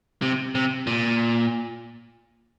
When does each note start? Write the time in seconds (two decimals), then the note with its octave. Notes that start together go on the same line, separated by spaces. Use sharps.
0.22 C3
0.55 C3
0.87 A#2